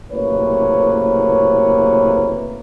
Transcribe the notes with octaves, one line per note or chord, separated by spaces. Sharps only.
F#1 A2 C3 A#3 B4 C#5